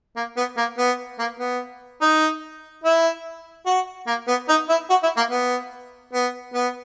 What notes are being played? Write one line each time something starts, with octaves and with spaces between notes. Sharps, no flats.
A#3
B3
A#3
B3
A#3
B3
D#4
E4
F#4
A#3
B3
D#4
E4
F#4
E4
A#3
B3
B3
B3